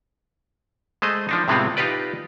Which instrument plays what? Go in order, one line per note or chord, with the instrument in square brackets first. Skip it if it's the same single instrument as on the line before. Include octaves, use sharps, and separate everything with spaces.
[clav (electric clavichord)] G#3 A3 C5 D#5
F3 D4 D#4
A2 C3 G#3 B3 C4 F4
D#4 F4 G4 B4 D5